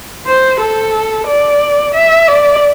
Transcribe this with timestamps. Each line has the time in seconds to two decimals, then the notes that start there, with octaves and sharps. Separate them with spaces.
0.27 C5
0.61 A4
1.28 D5
1.95 E5
2.28 D5